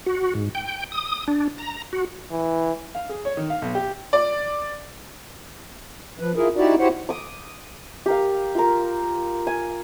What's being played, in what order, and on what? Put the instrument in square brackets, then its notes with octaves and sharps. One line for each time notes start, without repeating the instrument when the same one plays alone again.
[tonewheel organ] F#4
G#2
G5
D#6
D4
A#5
F#4
[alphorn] E3
[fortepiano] F5
G#4
C#5
D#3
F5
B1
G4
[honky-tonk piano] D5
[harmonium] F3 B4
E4 F4 G#4 A#4
D#4 E4 F#4 G4 D5
E4 F#4 G4 C5 C#5 F#5
[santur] D6 D#6
G4 A#4 F5
F4 A#4
G#5